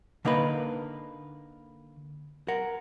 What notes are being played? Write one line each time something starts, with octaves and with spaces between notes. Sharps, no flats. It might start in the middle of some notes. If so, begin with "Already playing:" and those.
D3 A#3 D#4 A#4 B4
A#4 F#5